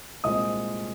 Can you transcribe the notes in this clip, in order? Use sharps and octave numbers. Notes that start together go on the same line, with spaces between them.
C2 A#2 G#3 C4 D#5 D#6